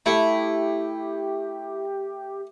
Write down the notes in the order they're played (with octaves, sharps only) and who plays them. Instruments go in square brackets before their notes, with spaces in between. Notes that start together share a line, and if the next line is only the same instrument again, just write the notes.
[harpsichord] A3 [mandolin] E4 [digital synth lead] G4